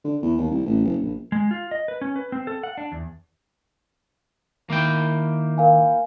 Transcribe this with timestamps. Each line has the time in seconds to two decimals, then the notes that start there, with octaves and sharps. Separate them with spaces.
0.04 D3
0.23 E2
0.37 D#2
0.51 C2
0.66 A1
0.85 F#1
1.01 A#1
1.32 G#3
1.51 F4
1.71 D#5
1.88 B4
2.01 C#4
2.16 B4
2.32 C4
2.47 A4
2.63 F#5
2.78 D4
2.92 E2
4.70 D#3 A#3 E4 G5
5.58 A#4 F5 G#5